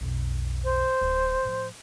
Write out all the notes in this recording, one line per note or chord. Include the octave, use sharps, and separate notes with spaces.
B1 F2
C5
D1
A2 F3